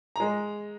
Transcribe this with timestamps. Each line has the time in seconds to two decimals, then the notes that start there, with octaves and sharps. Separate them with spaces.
0.16 G#3 A#5